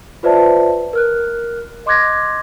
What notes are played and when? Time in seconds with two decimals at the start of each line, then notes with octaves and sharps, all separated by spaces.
0.23 F4 B4 C5 D5 E5 A5
0.93 A#4 F6 F#6
1.86 D#5 C6 D6 F#6 G#6 A#6